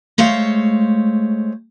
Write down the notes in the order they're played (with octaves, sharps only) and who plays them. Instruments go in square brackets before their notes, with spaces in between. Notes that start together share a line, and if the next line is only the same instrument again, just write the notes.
[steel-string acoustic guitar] G#3 A3 C5 C#5 F5